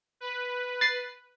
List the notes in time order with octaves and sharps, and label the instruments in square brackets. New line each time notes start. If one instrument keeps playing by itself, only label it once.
[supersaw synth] B4
[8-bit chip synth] A6 C7